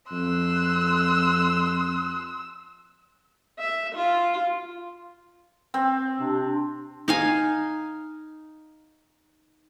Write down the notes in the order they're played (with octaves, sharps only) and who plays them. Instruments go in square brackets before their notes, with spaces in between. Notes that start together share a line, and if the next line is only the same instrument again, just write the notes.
[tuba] F2 [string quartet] C6 F#6 [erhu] E6
[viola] E5
F4
[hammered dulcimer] C4
[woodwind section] C3 D4
[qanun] D#4 F5 G#5